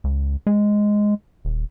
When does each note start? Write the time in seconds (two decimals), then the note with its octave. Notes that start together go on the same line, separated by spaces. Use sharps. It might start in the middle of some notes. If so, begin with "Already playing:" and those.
0.04 C#2
0.47 G#3
1.45 D#1